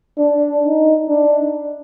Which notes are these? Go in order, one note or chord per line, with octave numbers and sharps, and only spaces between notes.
D4
D#4
D4